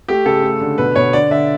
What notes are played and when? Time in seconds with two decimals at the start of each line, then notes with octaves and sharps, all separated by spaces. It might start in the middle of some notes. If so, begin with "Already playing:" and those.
0.08 A3 G4
0.26 C#3 A4
0.43 A3
0.61 D3
0.78 B2 B4
0.95 B2 C#5
1.13 D3 D5
1.30 D3 E5